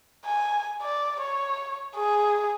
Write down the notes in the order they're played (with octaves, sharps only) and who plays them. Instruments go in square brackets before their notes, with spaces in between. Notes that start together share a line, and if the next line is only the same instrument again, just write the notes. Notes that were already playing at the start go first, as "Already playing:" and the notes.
[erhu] G#5
D5
C#5
G#4